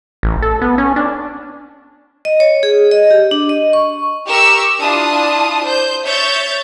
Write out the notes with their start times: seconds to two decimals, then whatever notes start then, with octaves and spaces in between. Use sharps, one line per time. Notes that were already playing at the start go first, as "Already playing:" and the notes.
0.23 A1
0.42 A4
0.61 B3
0.78 C#4
0.96 D4
2.25 D#5
2.40 C#5
2.63 G#4
2.91 D#5
3.11 G4
3.31 D4
3.49 D#5
3.73 C#6
4.26 G4 A#4 C#6 E6
4.81 D4 E4 F4 A5 D#6
5.64 C5 G6
6.05 C#5 E5 G6 A6